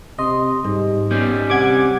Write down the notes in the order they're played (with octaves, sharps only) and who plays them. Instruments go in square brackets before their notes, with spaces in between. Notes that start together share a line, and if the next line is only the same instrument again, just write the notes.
[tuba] C3 [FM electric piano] D#5 [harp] C6
[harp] G#2 [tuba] G3
[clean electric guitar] G3 C#4 [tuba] B3 [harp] G6 C7
[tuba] C3 [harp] F#5 G#5 [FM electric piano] D6 G#6